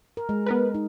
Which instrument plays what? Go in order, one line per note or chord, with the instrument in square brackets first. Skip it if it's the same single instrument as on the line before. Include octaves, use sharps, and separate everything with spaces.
[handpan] A#4
G#3
[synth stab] B3 A#4 B4
[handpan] D#4